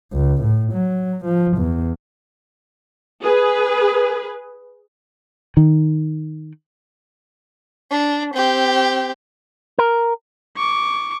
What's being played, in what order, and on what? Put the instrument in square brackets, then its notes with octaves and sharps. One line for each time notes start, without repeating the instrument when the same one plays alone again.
[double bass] C#2
A2
F#3
F3
E2
[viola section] G#4 B4
[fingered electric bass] D#3
[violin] D4
C4 G4
[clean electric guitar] A#4
[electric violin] C#6 D6